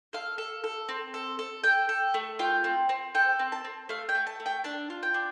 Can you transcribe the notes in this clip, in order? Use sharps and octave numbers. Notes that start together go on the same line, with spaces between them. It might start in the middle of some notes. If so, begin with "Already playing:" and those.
A4 F5
A4
A4
C4
A4
A4
A4 G5
A4
A3
F4 G5
C4
C4
A4 G5
C4
A5
C4
A3 F5
G5
A3
A5
A3
G5
D4 A5
F4
G5
D4